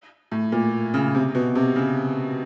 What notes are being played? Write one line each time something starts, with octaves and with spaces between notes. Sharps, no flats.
A2
A#2
C#3
C3
B2
C3
C#3